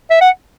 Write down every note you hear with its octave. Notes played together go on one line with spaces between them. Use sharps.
E5
F#5